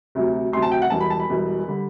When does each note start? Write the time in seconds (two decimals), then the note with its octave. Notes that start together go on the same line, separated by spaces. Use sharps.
0.15 D2 C3 F#3
0.52 D2 C3 F#3 C6
0.62 A5
0.72 G5
0.82 F#5
0.90 E1 E2 B2 G3 A5
1.01 B5
1.10 A5
1.20 B5
1.29 E1 E2 B2 G3
1.68 D3 G3